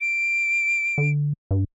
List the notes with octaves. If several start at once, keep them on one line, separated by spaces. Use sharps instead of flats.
D7
D3
G2